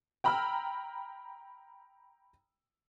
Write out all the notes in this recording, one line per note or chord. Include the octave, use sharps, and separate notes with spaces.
G5 A#5 B5 E6 F6